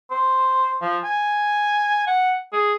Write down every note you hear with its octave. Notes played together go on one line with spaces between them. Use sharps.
C5
F3
G#5
F#5
G#4